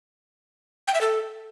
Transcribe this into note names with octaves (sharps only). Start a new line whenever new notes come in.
G5
E5
A4